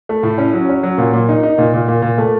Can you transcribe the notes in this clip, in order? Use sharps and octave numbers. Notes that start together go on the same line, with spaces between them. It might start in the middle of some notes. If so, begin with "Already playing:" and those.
A3
A2
C#4
F#3
C#4
F#3
A#2
A#2
D#4
D#4
A#2
A#2
A#2
A#2
A3